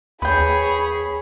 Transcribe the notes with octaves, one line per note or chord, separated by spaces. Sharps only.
D#2 G#4 B4 C#5 G5 B5